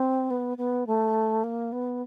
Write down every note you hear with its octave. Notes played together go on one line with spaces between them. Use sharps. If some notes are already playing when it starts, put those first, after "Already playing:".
Already playing: C4
B3
B3
A3
A#3
B3